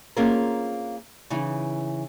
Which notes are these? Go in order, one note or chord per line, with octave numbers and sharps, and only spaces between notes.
A#3 C4 C#4 F4 G#4 A#4
C#3 E3 D#4